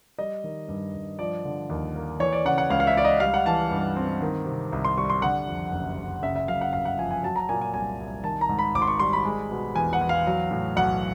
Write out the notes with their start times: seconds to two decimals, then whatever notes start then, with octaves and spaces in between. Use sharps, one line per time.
0.19 G3 D#5
0.44 D#3
0.68 G2
0.94 G2
1.19 F3 D5
1.45 D3
1.70 D#2
1.95 A#3
2.20 E3 C#5
2.32 D5
2.45 C#3 F#5
2.58 F#5
2.70 C#2 F5
2.80 F5
2.87 E5
2.96 C#2 D5
3.05 D#5
3.20 G3 F5
3.34 F#5
3.46 E3 A5
3.71 G2
3.96 C4
4.22 D#3
4.46 C3
4.72 C2
4.85 C6
4.97 G3 C#6
5.10 C6
5.22 D3 F#5
5.47 F2
5.72 F#1
5.98 F#1
6.22 C#3 E5
6.36 E5
6.48 F#2 F5
6.61 F#5
6.73 G1 F5
6.85 F#5
6.98 F3 G#5
7.11 G#5
7.23 F#3 A5
7.36 A#5
7.49 A#2 G#5
7.61 G#5
7.74 C2 G#5
8.00 C2
8.24 D#3 A5
8.41 A#5
8.49 G#2
8.59 B5
8.75 G#1 D6
8.82 C6
8.87 C#6
8.99 G3 C6
9.13 B5
9.25 G#3
9.51 B2
9.75 E2 G#5
9.93 F#5
10.01 E2
10.09 F5
10.26 F#3
10.51 A2
10.76 B1 F#5